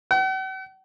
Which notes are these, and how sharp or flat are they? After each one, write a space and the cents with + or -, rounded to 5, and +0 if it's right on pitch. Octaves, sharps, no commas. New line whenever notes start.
F#5 +45